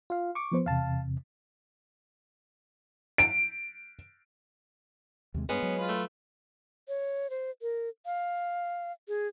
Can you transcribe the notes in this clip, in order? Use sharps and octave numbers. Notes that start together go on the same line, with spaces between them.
F4 F5
C#6 D6
F3 B3 C5
E2 C3 F5 A5
D7
D#2 C3 G#3
G2 G#3 B3 C#4
F#3
F4 B4
A3
C#5
C5
A#4
F5
G#4